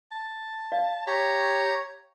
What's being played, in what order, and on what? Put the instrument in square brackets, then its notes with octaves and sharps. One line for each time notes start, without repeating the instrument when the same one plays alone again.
[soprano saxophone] A5
[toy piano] D5 F5
[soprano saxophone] G4 [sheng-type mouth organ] C#5 A#5